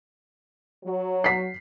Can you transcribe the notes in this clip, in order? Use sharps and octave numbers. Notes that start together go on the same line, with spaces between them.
F#3
B6 C7